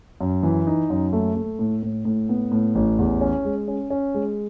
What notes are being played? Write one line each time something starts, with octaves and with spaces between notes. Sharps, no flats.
F#2
E3
D#4
F#2
A3
A3
A2
A2
A2
B3
A2
A1
E2
C#4
G#3
C#4
C#4
G#3